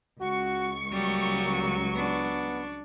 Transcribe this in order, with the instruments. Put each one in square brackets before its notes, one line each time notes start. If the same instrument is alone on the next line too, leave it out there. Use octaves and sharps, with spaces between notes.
[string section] C#2 C#6 [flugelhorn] F#4
[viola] F#3 [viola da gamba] G3 [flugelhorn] A#3
[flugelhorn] B3 [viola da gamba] D4